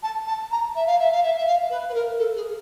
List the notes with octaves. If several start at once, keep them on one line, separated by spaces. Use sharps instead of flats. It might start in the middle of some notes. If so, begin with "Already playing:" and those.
A5
A5
A#5
E5
F5
E5
F5
E5
E5
F5
B4
B4
A#4
A4
G#4